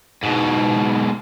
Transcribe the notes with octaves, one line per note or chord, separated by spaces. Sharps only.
G#2 B2